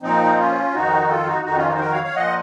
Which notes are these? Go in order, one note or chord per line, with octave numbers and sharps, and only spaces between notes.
A#2 F3 C4 D#4
C#4 F4
F2 D#3 D#4 F#4
F4 A4
D#4 F#4
F2 D#3 D#4 F#4
C#4 F4
D#4 F#4
C5
F#4 A#4
C#5 F5
C#5 F5
A#2 F3 D#5 F#5